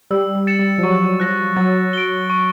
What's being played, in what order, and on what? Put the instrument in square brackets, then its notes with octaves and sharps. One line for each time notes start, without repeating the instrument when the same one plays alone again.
[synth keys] G3 [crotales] E6
[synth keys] G3
[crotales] A6 C#7 E7
[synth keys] G3
F3
[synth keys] F#3 [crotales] C#6
[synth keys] F3 [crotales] F#6 A#6
[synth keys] F#3 [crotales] A6
[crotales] D7 G7
C#6